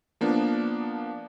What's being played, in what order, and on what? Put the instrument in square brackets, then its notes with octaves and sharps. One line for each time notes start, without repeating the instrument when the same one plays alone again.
[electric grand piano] F3 A#3 B3 D4